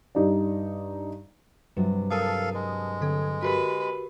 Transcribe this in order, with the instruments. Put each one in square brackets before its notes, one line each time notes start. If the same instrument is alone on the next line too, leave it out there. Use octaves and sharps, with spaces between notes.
[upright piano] G2 D#4 G4 D5
[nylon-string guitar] G2 C3 F#3 [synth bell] G3
[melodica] A4 F5 [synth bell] A#4 A5 D#6
[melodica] G#3
[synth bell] D3 A4
[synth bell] F#4 G4 A#4 [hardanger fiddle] B4